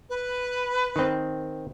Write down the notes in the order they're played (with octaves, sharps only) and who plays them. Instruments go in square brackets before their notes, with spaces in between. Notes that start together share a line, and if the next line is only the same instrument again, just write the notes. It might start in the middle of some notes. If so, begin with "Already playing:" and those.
[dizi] B4
[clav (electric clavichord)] D#3 C4